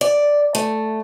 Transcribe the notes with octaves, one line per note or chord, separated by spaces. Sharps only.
D5
A3